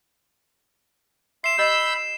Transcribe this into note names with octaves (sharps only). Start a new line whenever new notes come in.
E5 C6 C7 E7
G4 D#5 B5 E6 G6